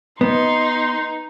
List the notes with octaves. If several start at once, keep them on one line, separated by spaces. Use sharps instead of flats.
B3 D#4 C6